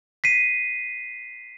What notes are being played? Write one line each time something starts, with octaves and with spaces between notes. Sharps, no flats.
B6 C7 D#7